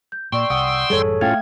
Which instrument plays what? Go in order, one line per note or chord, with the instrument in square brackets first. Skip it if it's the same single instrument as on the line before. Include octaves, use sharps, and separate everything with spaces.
[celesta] G6
[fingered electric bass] A#2 [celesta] D5 C#6 [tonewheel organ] G5 C6 E6
[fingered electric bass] C2 [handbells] F#5 D#6 D7
[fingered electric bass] A1 F#2 G3 [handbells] G#4 A4 C#5
[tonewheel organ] A2 C#4 F4 [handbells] A3 G#6 [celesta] F5 G5 F6